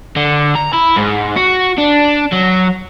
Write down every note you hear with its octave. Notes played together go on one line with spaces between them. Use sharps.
D3
A#5
E4
G#2
F#4
D4
F#3